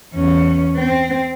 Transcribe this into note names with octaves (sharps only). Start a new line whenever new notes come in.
E2 C#4
C4